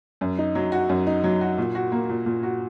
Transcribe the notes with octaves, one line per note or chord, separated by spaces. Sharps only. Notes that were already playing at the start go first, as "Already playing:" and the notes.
F#2
D#4
F#3
F#4
F#2
D#4
F#3
F#4
A#2
F#4
A#3
A#2
A#2
F#4